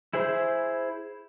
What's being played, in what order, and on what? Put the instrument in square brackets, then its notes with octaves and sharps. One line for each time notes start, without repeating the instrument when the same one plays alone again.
[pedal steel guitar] E4 G#4 C5 B5